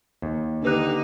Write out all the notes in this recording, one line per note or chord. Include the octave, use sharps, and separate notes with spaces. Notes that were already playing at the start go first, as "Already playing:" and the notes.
D#2
D3 A#3 D4 D#4 G4 B4 F#6